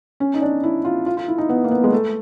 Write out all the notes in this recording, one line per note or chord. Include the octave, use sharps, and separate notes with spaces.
C#4
D#4
D4
E4
F4
F4
F4
E4
D#4
B3
A#3
B3
G#3
A3